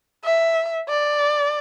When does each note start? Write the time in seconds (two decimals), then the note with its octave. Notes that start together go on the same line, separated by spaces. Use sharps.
0.25 E5
0.89 D5